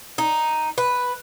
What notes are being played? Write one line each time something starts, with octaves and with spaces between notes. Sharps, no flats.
D#4
B4